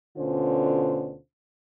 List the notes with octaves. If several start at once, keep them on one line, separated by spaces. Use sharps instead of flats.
D2 B2 D3 C#4 F4 C5